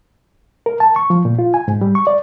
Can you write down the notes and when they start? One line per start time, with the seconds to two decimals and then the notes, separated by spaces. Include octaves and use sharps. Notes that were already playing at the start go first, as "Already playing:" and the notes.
0.66 A#4
0.80 A5
0.96 C#6
1.10 F3
1.25 A#2
1.39 F4
1.54 G#5
1.68 G#2
1.81 G3
1.95 C#6
2.07 D5